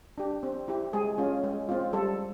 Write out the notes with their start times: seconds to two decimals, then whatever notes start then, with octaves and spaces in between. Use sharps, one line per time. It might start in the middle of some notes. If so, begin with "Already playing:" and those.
0.18 D4 G4
0.43 C4
0.68 E4 G4
0.93 G#3 G#4
1.18 C#4 F4
1.44 G#3
1.69 C4 F4
1.93 G3 A4